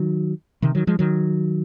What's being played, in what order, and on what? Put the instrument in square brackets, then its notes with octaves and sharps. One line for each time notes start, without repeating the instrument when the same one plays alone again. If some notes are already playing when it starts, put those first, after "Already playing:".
Already playing: [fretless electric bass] D#3 F#3
C3 D#3
D#3 F#3
F3 G#3
D#3 F#3